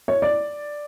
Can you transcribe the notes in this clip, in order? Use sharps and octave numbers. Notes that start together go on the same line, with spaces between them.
C#5
D5